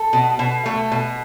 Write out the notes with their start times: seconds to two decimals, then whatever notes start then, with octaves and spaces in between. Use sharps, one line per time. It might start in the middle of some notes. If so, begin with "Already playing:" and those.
Already playing: A4
0.13 B2
0.39 B2
0.66 A3
0.92 B2